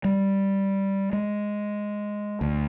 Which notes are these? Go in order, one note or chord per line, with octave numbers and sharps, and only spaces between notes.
G3
G#3
D2